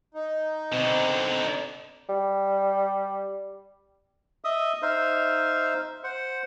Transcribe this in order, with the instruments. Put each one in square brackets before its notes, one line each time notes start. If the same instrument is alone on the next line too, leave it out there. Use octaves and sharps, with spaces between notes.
[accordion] D#4
[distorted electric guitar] B2 D3 [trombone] C4
[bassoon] G3
[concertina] D#5 E5 D#6
D#4 C5 E5 F5
C5 F#5